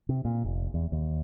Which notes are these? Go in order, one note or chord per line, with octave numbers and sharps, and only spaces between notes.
C3
A#2
F1
E2
D#2